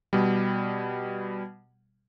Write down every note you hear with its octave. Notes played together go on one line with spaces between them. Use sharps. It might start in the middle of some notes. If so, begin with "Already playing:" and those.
B2 G3